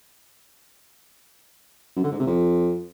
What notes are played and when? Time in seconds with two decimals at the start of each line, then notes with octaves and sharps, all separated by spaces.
1.96 F#2
2.04 D3
2.12 G#2
2.19 C3
2.27 F2